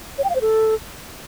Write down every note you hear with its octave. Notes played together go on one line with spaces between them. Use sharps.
C#5
G5
F5
C5
A4